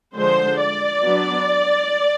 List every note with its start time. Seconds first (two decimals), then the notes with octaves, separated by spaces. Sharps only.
0.14 D3 F3 G#3 C5
0.60 D5
1.03 F#3 B3 D4